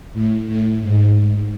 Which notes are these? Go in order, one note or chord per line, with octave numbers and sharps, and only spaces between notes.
A2
A2
G#2